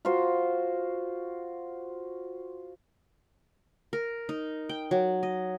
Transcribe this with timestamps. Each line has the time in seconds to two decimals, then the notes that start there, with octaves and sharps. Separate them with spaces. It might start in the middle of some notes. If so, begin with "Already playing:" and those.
0.05 F4 F#4 C5
3.93 A#4
4.29 D#4
4.69 G5
4.91 F#3
5.23 D#5